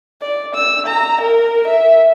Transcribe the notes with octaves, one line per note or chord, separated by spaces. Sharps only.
D5
E6
A#5
A#4
E5